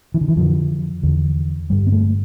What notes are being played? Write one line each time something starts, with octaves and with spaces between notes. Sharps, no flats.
E3
D3
E3
F2 D3 F3
E2 D3
G2 D3 G3
B3
A3